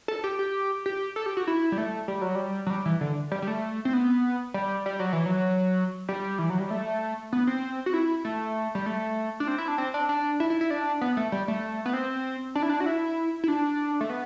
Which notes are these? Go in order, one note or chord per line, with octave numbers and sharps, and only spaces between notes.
A4
G4
G4
G4
A4
G4
F#4
E4
G3
A3
G3
F#3
G3
F#3
G3
E3
D3
G3
G3
A3
C4
B3
G3
G3
F#3
E3
F#3
G3
E3
F#3
G3
A3
B3
C4
F#4
E4
A3
G3
A3
D4
C4
E4
D4
C4
D4
D4
E4
E4
E4
D4
B3
A3
G3
A3
B3
C4
D4
E4
D4
F#4
E4
E4
D4
A3
B3